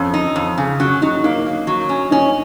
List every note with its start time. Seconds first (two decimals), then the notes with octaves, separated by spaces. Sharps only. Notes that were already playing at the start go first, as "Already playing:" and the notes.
Already playing: F2 C#4
0.14 D#4
0.36 F2
0.58 C#3
0.80 F#3 C#4
1.02 F#3 D#4
1.24 A#3 D#4
1.46 A#3
1.67 F#3
1.89 C#4
2.11 C#4 D#4